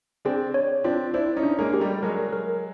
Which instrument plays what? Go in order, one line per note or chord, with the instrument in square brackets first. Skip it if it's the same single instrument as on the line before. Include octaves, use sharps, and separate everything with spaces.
[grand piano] C4 D4 [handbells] G#4
[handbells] C#5
[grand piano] C4 D4 [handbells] F4
[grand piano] D4 E4 [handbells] C5
[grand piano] C#4 D#4
[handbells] D4
[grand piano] G#3 A#3
[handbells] G4
[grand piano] G3 A3
[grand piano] F#3 G#3 [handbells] A#4
[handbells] A#4